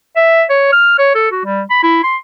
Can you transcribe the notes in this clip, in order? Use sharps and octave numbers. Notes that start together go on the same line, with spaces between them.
E5
C#5
F6
C#5
A4
F#4
G3
B5
E4
C6